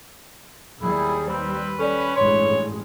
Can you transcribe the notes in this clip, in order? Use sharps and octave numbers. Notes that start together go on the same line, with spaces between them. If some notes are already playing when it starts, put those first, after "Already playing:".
D#2 G3 E4 G#4
C4 B4 C5
C#4 A4 D5
A1 G2 G#3 C#5 C6